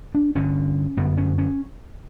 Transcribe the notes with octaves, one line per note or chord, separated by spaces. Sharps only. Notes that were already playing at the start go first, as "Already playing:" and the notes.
D4
G1 G2 D3 C#4
G1 F#2 D3 B3
C#4
C#4